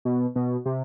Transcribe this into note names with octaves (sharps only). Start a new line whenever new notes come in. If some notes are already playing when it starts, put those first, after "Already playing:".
B2
B2
C3